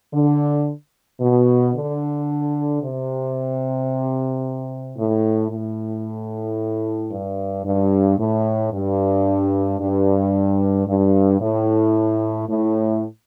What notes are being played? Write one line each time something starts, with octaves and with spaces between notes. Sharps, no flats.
D3
B2
D3
C3
A2
A2
G2
G2
A2
G2
G2
G2
A2
A2